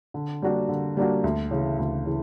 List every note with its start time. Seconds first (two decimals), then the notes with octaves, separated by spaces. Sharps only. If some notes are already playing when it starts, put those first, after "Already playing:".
0.14 D3
0.42 G3 A#3 D4 F#4
0.69 D3
0.97 G3 A#3 D4 F#4
1.24 D2
1.51 C#3 E3
1.79 D2
2.06 C#3 E3